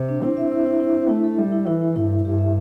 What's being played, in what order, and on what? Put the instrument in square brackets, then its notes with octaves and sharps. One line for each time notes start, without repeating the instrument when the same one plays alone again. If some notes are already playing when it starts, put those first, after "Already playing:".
Already playing: [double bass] C3
[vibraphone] D4
[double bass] C4 [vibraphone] E4
[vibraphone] E5
E4
E4
E4
E4
[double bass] A3 [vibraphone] E4
[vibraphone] A4
[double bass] G3 [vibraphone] E5
[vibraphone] E4
[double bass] E3 [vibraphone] E4
[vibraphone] E4
[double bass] G2 [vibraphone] E4
[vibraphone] E4
[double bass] G2 [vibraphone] G4
[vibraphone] E5